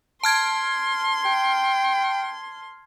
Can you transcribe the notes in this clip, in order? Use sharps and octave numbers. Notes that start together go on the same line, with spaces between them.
A5 C6 F6 G#6
G5